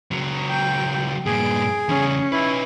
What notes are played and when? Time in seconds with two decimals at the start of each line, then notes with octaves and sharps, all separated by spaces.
0.11 C#2 F#3
0.50 G5
1.26 G2 A#2 G#4 D7
1.89 E2 C#3 C#4
2.32 D#4 E4 B4